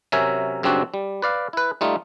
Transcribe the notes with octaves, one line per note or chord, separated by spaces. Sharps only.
C3 F#3 C#4 A#4 E5 G#5
F#2 C#3 G3 C4 D4 F#4
G3
B4 D5 F5
E4 B4
G3 A3 D#4 F4